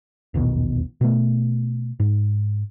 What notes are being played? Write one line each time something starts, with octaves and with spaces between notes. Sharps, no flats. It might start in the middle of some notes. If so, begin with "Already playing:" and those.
E1 A#1 D#2 B2
B2 A3
G#2